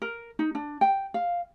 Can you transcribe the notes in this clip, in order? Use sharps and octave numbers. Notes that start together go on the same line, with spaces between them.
A#4
D#4
D4
G5
F5